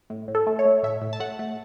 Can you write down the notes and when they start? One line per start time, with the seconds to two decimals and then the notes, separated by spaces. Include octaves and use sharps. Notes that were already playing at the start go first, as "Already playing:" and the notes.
0.10 A2
0.28 A2
0.35 A4
0.47 A3
0.59 C#5
0.65 A3
0.83 A2 E5
1.01 A2
1.13 A5
1.20 A3 F#5
1.39 A3